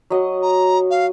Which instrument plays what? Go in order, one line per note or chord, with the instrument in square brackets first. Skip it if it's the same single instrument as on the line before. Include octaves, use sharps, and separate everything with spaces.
[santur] F#3 D#5
[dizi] A#5
F5